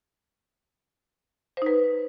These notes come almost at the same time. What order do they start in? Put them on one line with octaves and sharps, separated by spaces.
C5 D#4 B4